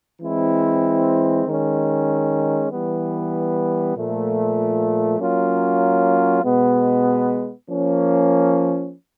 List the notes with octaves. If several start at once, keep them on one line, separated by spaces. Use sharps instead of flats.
E3 G#3 C4 E4
D#3 G#3 C#4
E3 G3 B3
A#2 F3 A3
F#3 A#3 C#4 F4
B2 G#3 B3
F3 A#3 C#4